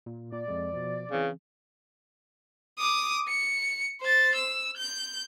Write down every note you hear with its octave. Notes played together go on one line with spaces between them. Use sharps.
A#2
A#2 D5
F2 G#3
B2 F3
C#3 E3 C4
D6 D#6
C#7
C5 A6
E6
G6